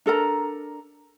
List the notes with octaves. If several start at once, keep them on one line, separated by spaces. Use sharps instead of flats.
D4 A4 A#4 A#5